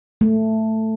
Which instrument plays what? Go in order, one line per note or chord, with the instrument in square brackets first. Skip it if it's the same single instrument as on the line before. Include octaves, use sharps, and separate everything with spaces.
[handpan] A3